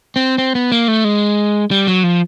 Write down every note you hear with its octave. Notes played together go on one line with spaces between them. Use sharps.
C4
C4
B3
A#3
A3
G#3
G3
F#3
F3